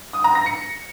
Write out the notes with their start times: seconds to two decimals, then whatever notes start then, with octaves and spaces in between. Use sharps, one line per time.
0.13 D#6
0.24 A#5
0.35 A#6
0.46 C#7